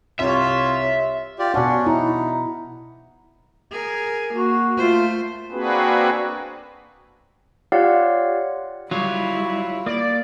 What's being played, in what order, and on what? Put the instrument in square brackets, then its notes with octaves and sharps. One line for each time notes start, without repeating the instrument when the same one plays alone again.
[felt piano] C2 G4 [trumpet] F4 [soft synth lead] C#5 [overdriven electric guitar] E5
[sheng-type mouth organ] F4 G4 D5
[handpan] B2 F#5 [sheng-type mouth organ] C#4 D4
[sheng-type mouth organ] D#4 [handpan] E4
[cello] G#4 A#4
[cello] A#3 [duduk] F#4
[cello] A3 C5 [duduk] F4
[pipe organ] A#3 C4 D4 F#4 G#4 B4
[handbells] F4 G4 C#5 D5 F5 F#5
[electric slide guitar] F#3 G3 [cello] E4 [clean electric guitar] F4 C#5
[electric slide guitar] A#3 [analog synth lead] D5